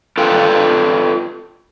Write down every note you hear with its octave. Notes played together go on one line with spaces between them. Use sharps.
F4 A4 B4 F5 G5